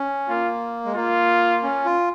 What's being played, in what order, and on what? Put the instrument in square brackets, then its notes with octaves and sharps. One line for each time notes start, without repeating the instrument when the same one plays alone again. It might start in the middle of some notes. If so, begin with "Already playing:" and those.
Already playing: [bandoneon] C#4
[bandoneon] A#3 [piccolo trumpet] F4
[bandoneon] G#3
[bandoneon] A#3 [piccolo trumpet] F4
[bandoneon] C#4
F4